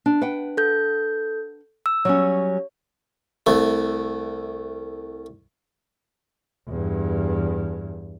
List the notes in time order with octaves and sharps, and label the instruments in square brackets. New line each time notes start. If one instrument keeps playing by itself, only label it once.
[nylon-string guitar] D4
B4 F#5 G5
[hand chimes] A4 G6
E6
[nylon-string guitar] F#3 G3 C#4 [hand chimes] C#5
[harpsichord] C2 A3
[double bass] E2 G2